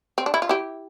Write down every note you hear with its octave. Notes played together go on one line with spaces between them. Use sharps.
C4
D4
E4
F4
E4 G4